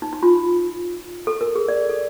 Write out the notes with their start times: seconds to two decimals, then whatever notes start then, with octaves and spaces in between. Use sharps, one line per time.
0.02 D#4
0.13 D#4
0.23 F4
1.27 A4
1.41 A#4
1.56 G#4
1.68 D5
1.89 A4